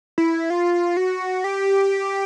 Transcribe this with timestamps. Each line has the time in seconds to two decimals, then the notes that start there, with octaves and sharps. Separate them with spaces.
0.18 E4
0.50 F4
0.97 F#4
1.44 G4